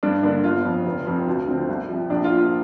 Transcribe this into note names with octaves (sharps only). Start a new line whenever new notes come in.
G2 D4
D3 A#3 D4
G1 F4
F2 F3
F1
F2 F3 C4
D2
D3 F3 C4
C2
C3 F3
A#1 D4
F4
A#2 F3
F4